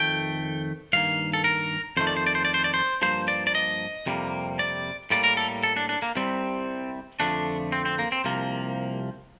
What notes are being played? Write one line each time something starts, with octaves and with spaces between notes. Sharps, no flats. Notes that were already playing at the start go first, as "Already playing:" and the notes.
Already playing: F2 D#3 A3 G5
G2 D#3 A#3 F5
A4
A#4
F2 D#3 A3 C5
D5
C5
D5
C5
D5
C5
D5
C5
G2 F3 A#3 C5
D5
D5
D#5
F2 C3 G3 A#3
D5
A2 G3 A#3 D5
A#4
A4
A4
D4
D4
A#3
C2 C3 G3 C4
F2 D3 F3 A3 D4
C4
C4
A#3
C4
C2 C3 F3 A#3